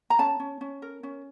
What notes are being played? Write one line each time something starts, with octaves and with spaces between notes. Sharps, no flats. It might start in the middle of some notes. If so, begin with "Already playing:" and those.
A#5
C#4 A5
C#4
C#4
A#4
C#4